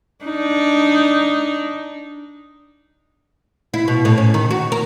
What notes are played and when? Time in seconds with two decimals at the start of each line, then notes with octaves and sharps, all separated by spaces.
0.25 D4 D#4
3.74 E4
3.88 B2
4.05 A2
4.18 C#4
4.34 D#3
4.51 F#4
4.72 A#4